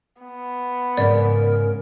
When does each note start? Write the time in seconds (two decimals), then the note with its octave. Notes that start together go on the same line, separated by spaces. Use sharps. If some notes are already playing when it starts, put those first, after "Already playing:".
0.22 B3
0.97 G#2 C#3 A#4 D5